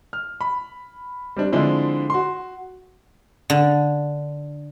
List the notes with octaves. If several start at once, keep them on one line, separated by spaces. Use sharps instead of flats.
F6
B5
G3 C4 D4
D3 F3 G#3 C4 D4 E4
F#4 C6
D3